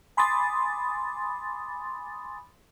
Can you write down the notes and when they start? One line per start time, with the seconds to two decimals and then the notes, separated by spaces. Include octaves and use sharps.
0.17 G#5 B5 C6 D6 D#6 A6